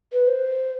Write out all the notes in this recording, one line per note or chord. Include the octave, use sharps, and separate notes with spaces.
B4
C5